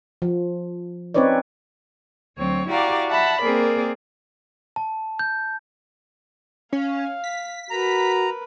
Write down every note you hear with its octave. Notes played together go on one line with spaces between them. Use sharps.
F3
C4 C#4 D#4 B4 C#5 D5
D2 F#3 C4 C#5
E4 F#4 G4 D5 F5 A#5
E5 F#5 A5 B5
A#3 C4 G#4 A#4 D5
A5
G6
C#4 F5
B6
F#4 A#4 B4 A#5